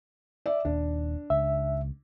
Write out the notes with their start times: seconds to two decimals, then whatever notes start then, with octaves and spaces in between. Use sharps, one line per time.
0.46 D5 E5
0.65 D#1 D#2 D4
1.30 C#2 E5